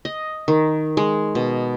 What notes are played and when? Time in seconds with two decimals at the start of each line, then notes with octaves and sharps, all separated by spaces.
0.05 D#5
0.48 D#3
0.97 G#3
1.35 B2